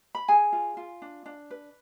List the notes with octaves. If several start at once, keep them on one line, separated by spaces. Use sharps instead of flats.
B5
G#4 G#5
F4
F4
D4
D4
B4